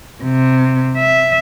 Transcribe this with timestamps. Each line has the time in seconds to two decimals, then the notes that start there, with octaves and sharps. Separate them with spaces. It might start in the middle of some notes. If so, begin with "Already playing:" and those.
0.23 C3
0.98 E5